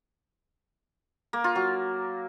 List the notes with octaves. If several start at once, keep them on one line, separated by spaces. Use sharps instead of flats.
A#3
F4
F#3